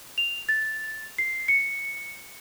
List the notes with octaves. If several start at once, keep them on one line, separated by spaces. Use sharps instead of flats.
F7
A6
C7
C#7